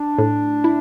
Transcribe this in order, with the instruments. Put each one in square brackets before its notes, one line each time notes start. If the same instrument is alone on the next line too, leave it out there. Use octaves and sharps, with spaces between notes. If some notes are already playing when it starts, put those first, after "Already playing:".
Already playing: [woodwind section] D4
[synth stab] A2
E4